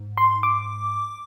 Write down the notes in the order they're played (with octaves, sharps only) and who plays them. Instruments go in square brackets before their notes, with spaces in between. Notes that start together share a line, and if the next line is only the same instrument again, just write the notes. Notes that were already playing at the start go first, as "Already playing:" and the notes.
Already playing: [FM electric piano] G#2
C6
D6